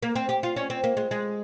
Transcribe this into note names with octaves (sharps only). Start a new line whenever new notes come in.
A#3
C4
G4
F4
C#4
C4
A#3
G#3
G#3